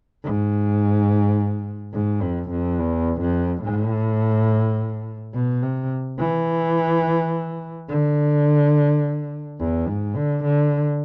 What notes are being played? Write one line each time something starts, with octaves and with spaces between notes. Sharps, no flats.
G#2
G#2
F2
F2
E2
F2
A2
B2
C3
E3
D3
E2
G#2
D3
D3